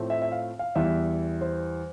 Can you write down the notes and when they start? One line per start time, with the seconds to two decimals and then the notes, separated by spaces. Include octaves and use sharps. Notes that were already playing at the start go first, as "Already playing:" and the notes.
Already playing: A2 F3 A3 C4
0.10 E5
0.22 E5
0.32 F5
0.59 F5
0.75 E2 E3 G3 E5
1.41 C5